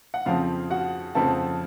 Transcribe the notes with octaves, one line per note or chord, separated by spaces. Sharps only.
F#5
F2 C#3 F3 C4 F4 F5
F#4 F#5
F2 C#3 F3 C4 A4 A5